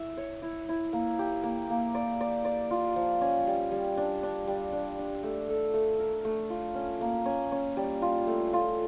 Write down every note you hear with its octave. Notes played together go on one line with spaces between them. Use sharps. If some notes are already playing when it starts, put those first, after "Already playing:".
Already playing: E4 E5
C#5
E4
E4
A#3
G4
A#3
A#3
D5
D5
D5
F4
F3
C#4
G3
G3
D4
D4
G3
D4
D4
A3
A4
A3
A#4
A3
F4
C#4
A#3
C#4
C#4
G3
F4
A3
F4